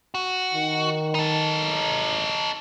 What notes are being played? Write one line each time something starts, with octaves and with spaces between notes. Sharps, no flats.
F#4
D#3
D#4 A4